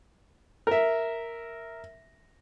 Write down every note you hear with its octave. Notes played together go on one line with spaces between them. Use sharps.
A#4 E5